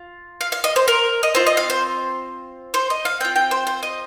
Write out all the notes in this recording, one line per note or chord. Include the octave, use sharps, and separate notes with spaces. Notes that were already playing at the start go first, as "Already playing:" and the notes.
Already playing: F4
F5
F5
D#5
C5
A#4
D#5
C4 F4 C5
D#5
F5
C5
C5
D#5
F5
C4 F4 G5
G5
C5
C5
D#5